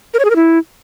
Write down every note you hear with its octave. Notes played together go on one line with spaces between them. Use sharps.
A#4
C#5
G#4
A#4
E4